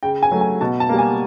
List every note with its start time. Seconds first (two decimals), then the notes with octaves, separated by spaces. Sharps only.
0.03 C#3 G5
0.23 G#5
0.31 F#3 A3
0.41 G#5
0.61 B2 A5
0.80 A5
0.89 G3 A#3
0.99 G#5